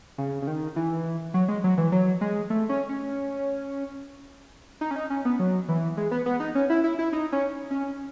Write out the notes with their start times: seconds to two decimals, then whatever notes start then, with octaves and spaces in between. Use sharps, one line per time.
0.18 C#3
0.42 C#3
0.47 D#3
0.76 E3
1.34 F#3
1.48 G#3
1.64 F#3
1.78 E3
1.92 F#3
2.21 G#3
2.50 A3
2.69 C#4
2.89 C#4
4.81 D#4
4.91 C#4
4.96 D#4
5.10 C#4
5.25 B3
5.39 F#3
5.68 E3
5.97 G#3
6.11 B3
6.26 B3
6.40 D#4
6.55 C#4
6.70 E4
6.84 E4
6.99 E4
7.13 D#4
7.32 C#4
7.71 C#4